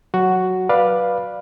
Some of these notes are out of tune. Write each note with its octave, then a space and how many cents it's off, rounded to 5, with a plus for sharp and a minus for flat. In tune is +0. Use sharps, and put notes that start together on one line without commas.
F#3 +0 F#4 +5
B4 -10 D5 +10 F5 +0